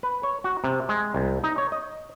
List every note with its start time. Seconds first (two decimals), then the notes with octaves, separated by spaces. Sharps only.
0.03 B4
0.23 C#5
0.44 F#4
0.64 C3
0.89 G#3
1.15 C2
1.44 D#4
1.58 C#5
1.72 D#5